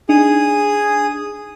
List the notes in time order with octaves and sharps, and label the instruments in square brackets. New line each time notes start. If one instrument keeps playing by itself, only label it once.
[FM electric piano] D4 D#4 [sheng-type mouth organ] G#4 D#6